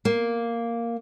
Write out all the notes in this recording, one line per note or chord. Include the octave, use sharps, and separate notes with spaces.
A#3